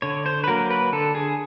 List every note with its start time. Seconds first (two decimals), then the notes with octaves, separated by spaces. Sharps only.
0.02 D3 C#5
0.26 C5
0.44 B4
0.48 F#3 A#3 A#4
0.70 B4
0.93 D3 A4
1.15 G#4